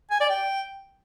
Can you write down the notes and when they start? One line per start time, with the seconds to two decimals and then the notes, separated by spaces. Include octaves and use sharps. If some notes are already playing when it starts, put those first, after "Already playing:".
0.11 G#5
0.20 D5
0.30 G5